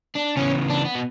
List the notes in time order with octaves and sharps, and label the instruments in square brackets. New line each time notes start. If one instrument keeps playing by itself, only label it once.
[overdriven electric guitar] D4
[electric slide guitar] C#3 E3 B3 [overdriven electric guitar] C#4
[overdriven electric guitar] D4
B3
B2